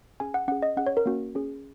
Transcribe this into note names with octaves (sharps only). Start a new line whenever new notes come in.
C#4 G#4 G#5
F#5
C#4 G#4 F#5
D#5
C#4 G#4 F#5
C#5
A#4
A#3 C#4 F#4
C#4 G#4